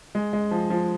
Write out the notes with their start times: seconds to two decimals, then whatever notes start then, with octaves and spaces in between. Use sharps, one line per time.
0.15 G#3
0.33 G#3
0.51 F3
0.70 F3